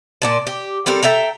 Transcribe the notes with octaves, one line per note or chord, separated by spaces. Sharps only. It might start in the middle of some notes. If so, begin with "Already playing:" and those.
A#2 D5 A5
G4
G3 C4 A4 A#4
A4 E5 G5 A#5